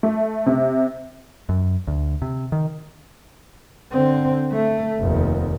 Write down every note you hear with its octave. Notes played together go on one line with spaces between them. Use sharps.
A3
C3
F#2
D2
C3
D#3
D3 C4
A3
F1 D#2